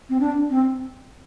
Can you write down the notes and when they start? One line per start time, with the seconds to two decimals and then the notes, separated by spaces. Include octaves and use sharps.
0.10 C4
0.20 D4
0.50 C4